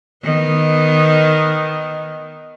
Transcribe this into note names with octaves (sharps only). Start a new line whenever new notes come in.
D#3 B3